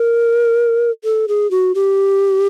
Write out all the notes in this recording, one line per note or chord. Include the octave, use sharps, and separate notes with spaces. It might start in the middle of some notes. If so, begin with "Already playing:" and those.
Already playing: A#4
A4
G#4
F#4
G4